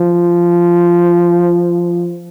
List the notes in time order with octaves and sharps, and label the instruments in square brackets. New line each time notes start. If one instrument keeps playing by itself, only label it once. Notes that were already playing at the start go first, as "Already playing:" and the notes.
Already playing: [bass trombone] F3